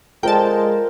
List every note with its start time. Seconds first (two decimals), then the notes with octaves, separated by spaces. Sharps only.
0.23 G#3 F4 A#4 C5 D5 G5 A5